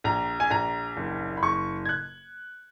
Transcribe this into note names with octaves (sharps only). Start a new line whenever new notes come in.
A#1 A#5
G#5
A#1 A#5
F#1
B5
F#1 C#6
G#6
F#6